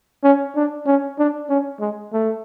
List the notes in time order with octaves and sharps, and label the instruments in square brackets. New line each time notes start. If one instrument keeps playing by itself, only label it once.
[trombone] C#4
D4
C#4
D4
C#4
G#3
A3